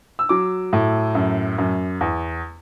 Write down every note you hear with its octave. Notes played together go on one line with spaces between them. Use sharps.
E6
F#3 D6
A2
F#2
F#2
E2